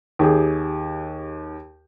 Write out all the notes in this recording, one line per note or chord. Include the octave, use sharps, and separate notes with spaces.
D#2 G4 G#4